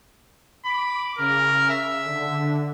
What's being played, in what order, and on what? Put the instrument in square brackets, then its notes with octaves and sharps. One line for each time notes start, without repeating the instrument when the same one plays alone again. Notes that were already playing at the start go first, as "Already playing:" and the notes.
[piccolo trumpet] B5 [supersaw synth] D6
[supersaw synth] C#3 [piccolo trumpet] A#4
[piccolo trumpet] E5
[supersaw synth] D3